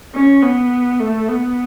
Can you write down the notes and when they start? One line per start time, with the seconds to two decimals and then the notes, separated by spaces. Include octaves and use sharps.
0.14 C#4
0.43 B3
1.00 A3
1.29 B3